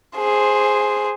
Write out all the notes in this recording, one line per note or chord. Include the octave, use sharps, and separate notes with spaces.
G#4 C5